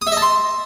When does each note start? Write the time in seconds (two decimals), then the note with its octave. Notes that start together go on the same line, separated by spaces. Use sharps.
0.02 D#6
0.07 E5
0.12 D#5
0.17 A5
0.22 C6